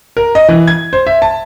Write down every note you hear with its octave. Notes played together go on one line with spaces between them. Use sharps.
A#4
D#5
E3
G#6
C5
E5
A5